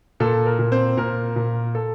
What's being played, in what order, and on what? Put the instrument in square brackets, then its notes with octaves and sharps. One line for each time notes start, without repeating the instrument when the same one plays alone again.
[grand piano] A#2 A4
A#4
A#2
C4 C5
A#2 A#4
A#2
A4